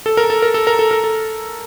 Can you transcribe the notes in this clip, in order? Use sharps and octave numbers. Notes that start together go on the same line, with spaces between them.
A4
A#4
A4
A#4
A4
A#4
A4
A#4
A4